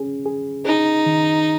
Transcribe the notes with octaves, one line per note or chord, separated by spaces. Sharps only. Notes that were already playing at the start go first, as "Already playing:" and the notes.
Already playing: C#4 G#4
G#4
D#4 G#4
D#3